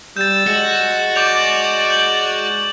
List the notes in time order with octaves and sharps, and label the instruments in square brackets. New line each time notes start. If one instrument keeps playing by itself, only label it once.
[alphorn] G3 [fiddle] E6 [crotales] G6 A6
[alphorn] G#3 [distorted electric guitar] F#4
[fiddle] D5 [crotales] D6 G6 F7
[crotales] G6 F#7